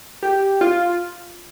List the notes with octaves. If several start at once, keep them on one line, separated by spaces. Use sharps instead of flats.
G4
F4